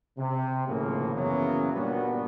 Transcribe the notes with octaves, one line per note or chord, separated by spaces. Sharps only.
C3
G#1 A2 C#3 F3 A#3
F#2 C#3 E3 F#3 A#3 B3
G2 A#2 G3 B3 D4 F#4